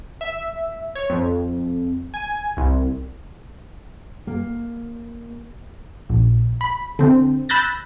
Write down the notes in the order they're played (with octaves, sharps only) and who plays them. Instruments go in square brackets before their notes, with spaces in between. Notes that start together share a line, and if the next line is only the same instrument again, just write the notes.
[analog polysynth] E5
C#5
F2
G#5
C2
[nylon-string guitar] A#3
[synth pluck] A#1
B5
D3 C4
B5 E6 F#6 G6 A6 A#6